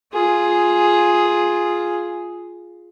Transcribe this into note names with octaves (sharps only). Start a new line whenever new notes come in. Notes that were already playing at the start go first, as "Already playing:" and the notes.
F4 G#4